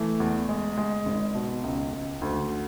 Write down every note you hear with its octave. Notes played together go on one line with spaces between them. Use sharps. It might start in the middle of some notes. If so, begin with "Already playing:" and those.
Already playing: E3 A3
E2
G#3
G#3
G#1
B2
C#2
C#2
D2